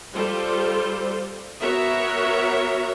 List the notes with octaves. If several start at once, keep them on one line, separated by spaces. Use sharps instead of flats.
G3 F4 A4 C5
B3 F#4 A#4 C#5 E5